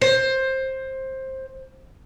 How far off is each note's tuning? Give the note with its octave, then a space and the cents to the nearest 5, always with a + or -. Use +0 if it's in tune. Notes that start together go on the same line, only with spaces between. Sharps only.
C5 +15